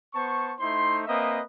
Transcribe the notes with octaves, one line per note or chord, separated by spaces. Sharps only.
B3 C5 A5 C#6
A3 D#4 E4 C5 C6
A#3 C4 B4 D#5 E5 D#6